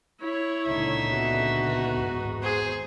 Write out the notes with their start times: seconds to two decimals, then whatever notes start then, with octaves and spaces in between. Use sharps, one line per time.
0.20 E4 C#5
0.67 C#2 A#2 D3 D#4 E5
1.09 B3 F#4
1.99 G#1 E2 G#2
2.42 G#4 C5